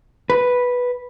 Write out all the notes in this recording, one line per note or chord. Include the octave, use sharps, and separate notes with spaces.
B4